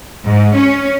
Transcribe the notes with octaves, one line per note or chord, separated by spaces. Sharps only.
G#2
C#4